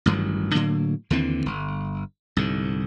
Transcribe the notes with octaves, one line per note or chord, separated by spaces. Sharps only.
A1 G2 D#3 F#3
A2 D3 F#3 A#3
D#2 D3 E3 C4
G1
C2 G#2 D3